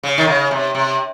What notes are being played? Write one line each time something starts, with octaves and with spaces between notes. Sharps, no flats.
C#3
D#3
C#3
C3
C3